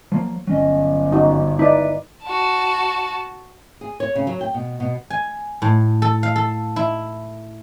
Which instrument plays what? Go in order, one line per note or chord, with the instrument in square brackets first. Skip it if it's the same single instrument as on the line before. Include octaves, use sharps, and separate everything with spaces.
[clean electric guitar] F3 F#3 A#3
[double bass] G1 [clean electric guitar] F#3 C#4 D#5
[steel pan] D#4 F#4
[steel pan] D#4 D5 [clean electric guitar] E4 B4
[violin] F#4 A5
[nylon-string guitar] G#4
C#5
C#3
F#3
G5
B2
B2
[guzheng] G#5
A2
A4
F5
A4
E4